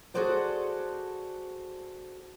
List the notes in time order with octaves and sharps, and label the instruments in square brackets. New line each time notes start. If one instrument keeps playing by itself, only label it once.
[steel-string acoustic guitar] F#4 G#4 A4 C5 D5 F#5